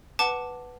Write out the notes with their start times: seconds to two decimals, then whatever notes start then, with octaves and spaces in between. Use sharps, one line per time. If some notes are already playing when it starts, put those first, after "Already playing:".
0.19 B4 F#5 A5 D6